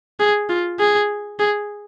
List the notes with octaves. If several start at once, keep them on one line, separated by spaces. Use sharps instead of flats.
G#4
F4
G#4
G#4